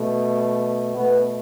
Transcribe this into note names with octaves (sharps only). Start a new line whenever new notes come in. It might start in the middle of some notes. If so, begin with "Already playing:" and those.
Already playing: B2 A3
B2 A3 B3